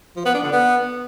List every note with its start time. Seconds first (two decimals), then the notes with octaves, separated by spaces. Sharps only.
0.17 F3
0.25 B3
0.34 D4
0.43 D3
0.52 B3